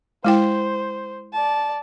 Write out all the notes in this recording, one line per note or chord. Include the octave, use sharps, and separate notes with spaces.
G#3 E4 C5 G5
D5 A5